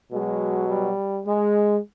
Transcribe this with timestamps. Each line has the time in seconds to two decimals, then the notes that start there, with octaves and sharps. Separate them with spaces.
0.12 B2 F#3 G#3
0.69 G3
1.27 G#3